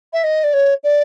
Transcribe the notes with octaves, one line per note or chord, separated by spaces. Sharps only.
E5
D#5
D5
C#5
D5